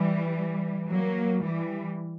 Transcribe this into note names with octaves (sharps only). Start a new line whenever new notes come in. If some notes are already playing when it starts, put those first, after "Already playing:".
Already playing: E3 G3
F#3 A#3
E3 G3